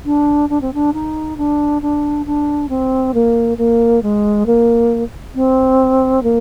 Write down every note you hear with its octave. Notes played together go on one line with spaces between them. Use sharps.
D4
D4
C4
D4
D#4
D4
D4
D4
C4
A#3
A#3
G#3
A#3
C4
A#3